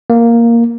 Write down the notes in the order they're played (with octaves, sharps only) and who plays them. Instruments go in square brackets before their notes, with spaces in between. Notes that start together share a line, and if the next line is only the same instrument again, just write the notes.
[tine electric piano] A#3